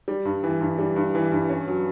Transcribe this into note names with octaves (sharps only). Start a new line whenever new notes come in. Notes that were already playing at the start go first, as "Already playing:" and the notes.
G3
G2
E3
G2
G3
G2
E3
G2
C#4
F#3